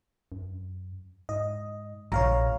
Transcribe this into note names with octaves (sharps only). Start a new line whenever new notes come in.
F#2
G#2 D#5
A#1 A#2 C#5 F5 A#5